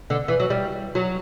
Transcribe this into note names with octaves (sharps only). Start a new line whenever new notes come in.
D3
E3
F#3
G3
F#3